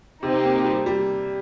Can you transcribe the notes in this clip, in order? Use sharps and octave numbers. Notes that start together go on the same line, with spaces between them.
C3 C4 D#4 G4
A#3
G3
G3